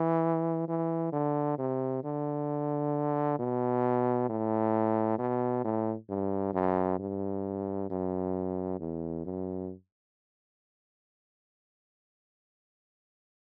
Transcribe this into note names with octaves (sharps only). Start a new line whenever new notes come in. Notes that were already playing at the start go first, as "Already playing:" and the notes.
Already playing: E3
E3
D3
C3
D3
B2
A2
B2
A2
G2
F#2
G2
F#2
E2
F#2